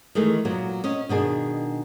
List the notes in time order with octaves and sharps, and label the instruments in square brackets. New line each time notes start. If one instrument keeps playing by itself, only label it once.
[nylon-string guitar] D#3 E3 G#3 A3
A#2 F#3 B3
C#4 D#5
B2 D#3 D4 G#4